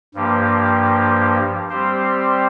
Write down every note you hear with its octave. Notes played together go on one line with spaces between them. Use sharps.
G2 F3 A#3 G4
G3 C4 G4 C5